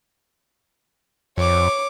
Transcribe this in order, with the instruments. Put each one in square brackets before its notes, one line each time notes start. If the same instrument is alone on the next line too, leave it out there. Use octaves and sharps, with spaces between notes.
[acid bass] F2 [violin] C#5 D6